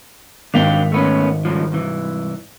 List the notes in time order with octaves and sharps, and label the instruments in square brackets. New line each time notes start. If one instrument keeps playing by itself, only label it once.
[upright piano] G#1 B6 F7 [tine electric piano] D#3 [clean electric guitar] D4 F5 G5
[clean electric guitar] A3 B3 C#4
C#2 G2 F3
C2 E3